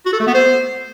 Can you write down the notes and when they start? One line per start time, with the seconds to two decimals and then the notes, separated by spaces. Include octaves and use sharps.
0.06 F#4
0.13 A4
0.20 A3
0.27 B3
0.34 C5